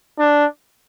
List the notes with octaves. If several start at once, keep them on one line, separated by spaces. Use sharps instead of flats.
D4